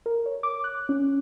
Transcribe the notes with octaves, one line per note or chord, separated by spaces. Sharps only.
A#4
C#5
D6
F#6
C#4